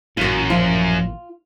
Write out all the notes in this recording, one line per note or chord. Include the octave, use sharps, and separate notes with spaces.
A1 F#2 A#2 F4 F#4
F3 F4